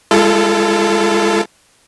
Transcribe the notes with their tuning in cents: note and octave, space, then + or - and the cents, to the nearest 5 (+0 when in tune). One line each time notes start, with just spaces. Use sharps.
G#3 -25 F4 -40 A4 +0